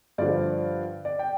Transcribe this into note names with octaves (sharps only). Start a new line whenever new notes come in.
G2 D3 F3 D5
D5
G5